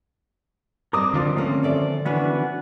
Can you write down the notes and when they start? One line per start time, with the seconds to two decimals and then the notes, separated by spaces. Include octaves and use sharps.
0.93 G3 C4 A#4 D#5 D6 D#6
1.14 D3 D#3 F3 D4 F4 D5
1.37 A3 A#3 C4 C#4
1.63 A4 D5 E5
2.06 E3 B3 C#4 D4 F#4 B4